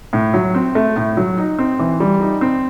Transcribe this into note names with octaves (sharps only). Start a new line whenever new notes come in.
A2
F#3
C4
A3
A2
F#3
D#4
C4
E3
G3
D#4
C4